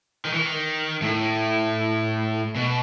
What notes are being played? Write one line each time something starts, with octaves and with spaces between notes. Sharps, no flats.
D#3
E3
D#3
A2
B2